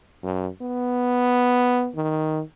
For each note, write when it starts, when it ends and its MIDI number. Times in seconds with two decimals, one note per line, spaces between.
0.23 0.48 42
0.62 1.90 59
1.95 2.41 51